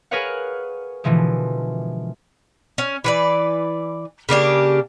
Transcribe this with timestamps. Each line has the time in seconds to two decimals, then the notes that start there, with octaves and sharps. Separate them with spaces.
0.11 G#4 A#4 B4 C#5 F5 F#5
1.04 B2 D3 E3 F3 G#3
2.78 C#4
3.04 E3 B4 D5
4.29 C#3 A#3 D4 G4